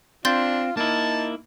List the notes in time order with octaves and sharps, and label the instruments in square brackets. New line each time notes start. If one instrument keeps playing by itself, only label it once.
[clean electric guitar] C4 [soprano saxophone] D4 [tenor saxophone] F4 [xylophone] C6 G6 A6
[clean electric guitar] A#3 E4 [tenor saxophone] D#4 [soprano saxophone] A5